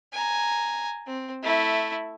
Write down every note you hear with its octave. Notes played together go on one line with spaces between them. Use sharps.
G#5 A#5
C4
A3 E4